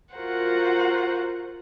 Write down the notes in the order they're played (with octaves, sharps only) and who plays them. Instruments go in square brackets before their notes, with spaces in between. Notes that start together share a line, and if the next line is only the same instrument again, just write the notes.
[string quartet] F4 F#4 A#4 C5 F#5